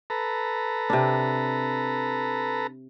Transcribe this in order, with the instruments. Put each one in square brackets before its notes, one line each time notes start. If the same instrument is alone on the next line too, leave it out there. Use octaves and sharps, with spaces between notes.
[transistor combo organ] A4 B4 A#5
[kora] C3 D4